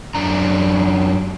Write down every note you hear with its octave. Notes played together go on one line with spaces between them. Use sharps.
F#2 D4 A#5